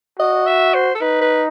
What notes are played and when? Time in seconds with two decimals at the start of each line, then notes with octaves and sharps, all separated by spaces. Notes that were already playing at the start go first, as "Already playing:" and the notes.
0.19 F#4 D#5
0.47 E5
0.74 C5
0.95 A4
1.01 D#4 B4
1.21 B4